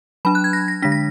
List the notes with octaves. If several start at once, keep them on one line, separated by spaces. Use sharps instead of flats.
F#3 D4 B5
F#6
G#6
A#6
A#6
D3 G#3 D4 B6
A#6